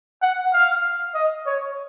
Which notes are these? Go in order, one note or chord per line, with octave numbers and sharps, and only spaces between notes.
F#5
F5
D#5
C#5